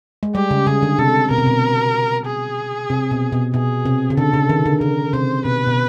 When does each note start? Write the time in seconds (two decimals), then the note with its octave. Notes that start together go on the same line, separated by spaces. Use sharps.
0.23 G#3
0.35 G3 G4
0.51 C#3
0.67 C#3 G#4
0.82 D3
0.99 C3 A4
1.30 B2 A#4
1.38 C3
1.46 B2
2.27 G#4
2.90 C3
3.11 B2
3.32 B2
3.54 B2 G#4
3.86 C3
4.10 C#3
4.17 D3 A4
4.34 C#3
4.49 D#3
4.66 D3
4.81 C#3 A#4
5.13 C3 C5
5.45 B2 B4
5.67 B2